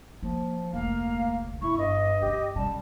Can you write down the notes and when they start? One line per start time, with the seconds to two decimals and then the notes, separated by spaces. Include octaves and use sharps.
0.23 F3 A#3
0.73 F1 D2 A#3 F5
1.62 G1 E4 C#6
1.78 G2 D#5
2.22 G2 C#3 G4
2.56 C#3 G3 A5